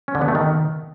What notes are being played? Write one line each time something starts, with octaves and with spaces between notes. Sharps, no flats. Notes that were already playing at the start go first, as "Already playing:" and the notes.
C#4
D3
B3
A3
D#3